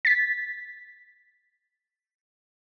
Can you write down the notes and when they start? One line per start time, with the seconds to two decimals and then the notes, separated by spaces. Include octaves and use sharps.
0.05 A6 B6